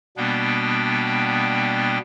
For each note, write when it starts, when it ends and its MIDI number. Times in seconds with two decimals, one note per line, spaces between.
0.17 1.98 47
0.17 1.98 55
0.17 1.98 58
0.17 1.98 59
0.17 1.98 62
0.17 1.98 79